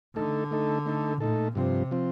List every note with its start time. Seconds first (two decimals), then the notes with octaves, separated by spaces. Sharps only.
0.16 D3 A3 D#4 A4
0.51 A3 D#4 A4
0.85 A3 D#4 A4
1.20 A#2 A3 D#4 A4
1.55 G2 C3 F3 C4
1.91 F3 C4